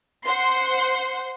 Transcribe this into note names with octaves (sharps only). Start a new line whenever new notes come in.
C5 F#5 C6